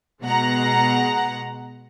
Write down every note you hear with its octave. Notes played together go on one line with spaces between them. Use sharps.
B2 G#3 F#5 A#5